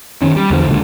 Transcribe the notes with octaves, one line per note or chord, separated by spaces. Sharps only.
F#2 D#3 C#4
G3
E2 D3 F3
C#2 A#2 D3